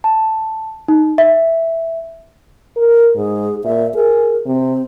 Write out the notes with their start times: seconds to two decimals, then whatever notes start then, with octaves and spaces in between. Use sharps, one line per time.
0.04 A5
0.88 D#4
1.18 E5
2.77 A#4
3.15 G#2 G#4
3.64 A#2 E5
3.94 G#4 A#4
4.46 C3 C4